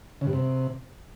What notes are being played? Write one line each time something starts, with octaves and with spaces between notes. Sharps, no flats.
C#3
G2
C3